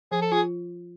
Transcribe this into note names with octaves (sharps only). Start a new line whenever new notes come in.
F3 G#4
A4
F4 G#4